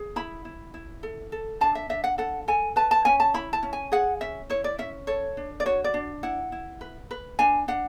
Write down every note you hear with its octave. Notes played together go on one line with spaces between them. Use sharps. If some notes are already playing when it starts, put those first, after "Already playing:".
Already playing: G#4
E4 B5
E4
E4
A4
A4
D4 A5
E5
D4 E5
F#5
A4 F#5
A4 G#5
B4 A5
A5
C#4 G#5
A5
E4 B5
A5
C#4
G#5
G#4 F#5
C#4 E5
E4 C#5
D5
C#4 E5
A4 C#5
D4
D5
F#4 C#5
D5
D4
E4 F#5
E4
B4
B4
D4 G#5
D4 F#5